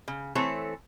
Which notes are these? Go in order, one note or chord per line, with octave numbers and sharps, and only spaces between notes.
C#3
E3 A3 C4 A4 C#5